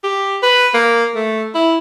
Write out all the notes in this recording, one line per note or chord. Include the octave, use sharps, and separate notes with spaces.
G4
B4
A#3
A3
E4